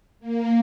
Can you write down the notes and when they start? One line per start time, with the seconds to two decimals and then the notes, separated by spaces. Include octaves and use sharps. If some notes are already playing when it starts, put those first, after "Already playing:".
0.20 A#3